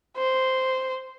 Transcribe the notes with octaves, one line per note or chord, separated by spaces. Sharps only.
C5